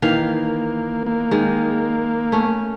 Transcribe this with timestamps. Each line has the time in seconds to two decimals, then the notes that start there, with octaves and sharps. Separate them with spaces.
0.02 D#3 E3 A#3 F5
1.06 A#3
1.31 D#3 G#3
2.32 A3 C#4